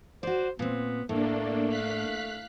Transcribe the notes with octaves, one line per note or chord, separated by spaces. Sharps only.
F#4 C5 D5
A#2 B3 C4
A2 A3 A#3 D4
F5 F#6 B6